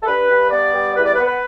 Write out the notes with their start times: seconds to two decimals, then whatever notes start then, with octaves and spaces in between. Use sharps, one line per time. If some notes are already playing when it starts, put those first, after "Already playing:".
0.03 A4
0.06 G2 B4
0.29 G2
0.51 B3 D5
0.73 G3
0.97 E2 B4
1.06 D5
1.15 B4
1.18 B3
1.26 B4